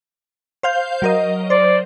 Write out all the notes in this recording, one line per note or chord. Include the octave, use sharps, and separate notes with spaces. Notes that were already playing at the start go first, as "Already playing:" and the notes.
C5 F5 G6
F#3 A#4 D#5
C5 D5